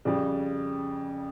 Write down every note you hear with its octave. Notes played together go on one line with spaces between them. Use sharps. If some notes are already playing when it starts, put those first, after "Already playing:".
F2 C#3 G3